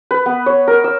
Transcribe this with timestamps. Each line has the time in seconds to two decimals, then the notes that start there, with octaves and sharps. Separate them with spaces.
0.11 B4
0.26 B3
0.46 C#5
0.68 A#4
0.84 E6